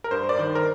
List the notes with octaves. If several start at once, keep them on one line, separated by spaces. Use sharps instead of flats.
A#4
G2 C5
D5
D#3 C5
A#4